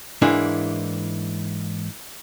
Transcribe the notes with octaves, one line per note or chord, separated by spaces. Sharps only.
G#2 E3 A#3 D4 E4